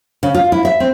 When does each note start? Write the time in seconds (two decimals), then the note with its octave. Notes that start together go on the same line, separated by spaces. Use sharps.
0.23 C#3
0.35 F4
0.52 E4
0.65 E5
0.80 C4